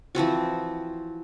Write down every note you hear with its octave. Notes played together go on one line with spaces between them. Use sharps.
E3 F3 C4 F#4